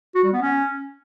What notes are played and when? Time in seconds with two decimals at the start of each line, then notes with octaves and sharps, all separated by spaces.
0.15 F#4
0.24 G3
0.33 B3
0.42 C#4